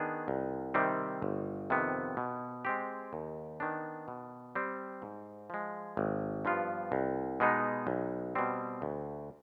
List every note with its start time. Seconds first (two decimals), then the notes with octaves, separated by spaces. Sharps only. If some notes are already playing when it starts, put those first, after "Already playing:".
Already playing: D#3 B3 D4 G#4
0.28 C2
0.74 C3 D#3 G3 C4
1.22 G1
1.70 F2 C3 D#3 B3
2.17 B2
2.65 G#3 C4 G4
3.13 D#2
3.60 D#3 B3 D4
4.08 B2
4.55 G3 C4
5.02 G#2
5.50 F3 G#3
5.97 G#1
6.45 G2 F3 B3 F4
6.92 C2
7.40 B2 G#3 B3 D#4
7.87 B1
8.35 B2 G3 C4
8.82 D2